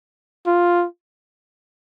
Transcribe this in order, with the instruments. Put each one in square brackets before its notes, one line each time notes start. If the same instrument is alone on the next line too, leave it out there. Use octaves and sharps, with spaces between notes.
[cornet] F4